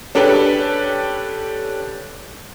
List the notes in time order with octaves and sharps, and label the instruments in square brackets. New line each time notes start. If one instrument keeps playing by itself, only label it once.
[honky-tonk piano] C#4 D4 G4 A4 B4